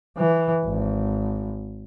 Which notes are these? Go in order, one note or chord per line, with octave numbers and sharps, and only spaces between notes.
E3
G#1